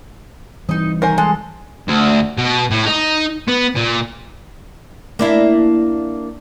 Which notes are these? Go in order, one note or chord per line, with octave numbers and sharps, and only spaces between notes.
E3 G3 C4 D#4 D#5
D#3 A#4 C5 G#5
G#3 A4
D2
B2
A2
D#4
B3
A#2
A#3 D4 E4